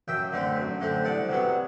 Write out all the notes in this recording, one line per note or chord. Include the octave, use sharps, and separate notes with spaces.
F#2 E5 G5
D3 A3 C4
F#2
D3 A3 C4
C2 D5 F#5
C3 F#3 B3